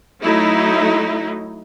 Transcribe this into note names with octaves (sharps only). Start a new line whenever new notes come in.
F#3 A3 D#4 E4